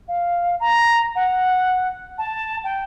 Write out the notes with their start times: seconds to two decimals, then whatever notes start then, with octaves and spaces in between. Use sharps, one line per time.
0.08 F5
0.59 A#5
1.15 F#5
2.18 A5
2.63 G5